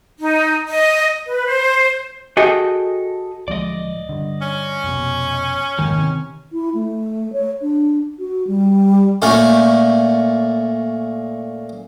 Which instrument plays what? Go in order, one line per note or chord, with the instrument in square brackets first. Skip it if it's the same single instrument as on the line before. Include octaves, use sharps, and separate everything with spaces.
[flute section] D#4
D#5
B4
C5
[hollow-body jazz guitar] F#4 G#4 A4 D#5 G5
[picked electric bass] D1 F3 G#3 [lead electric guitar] D5 D#5
[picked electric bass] G2 D3
[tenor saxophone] C#4
[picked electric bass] F1 B2
[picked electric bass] F1 D#2 G#2 [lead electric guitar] D#3
[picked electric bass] C3
[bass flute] E4
A3
C#5
D4
F#4
G3
[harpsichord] A#2 A3 C#4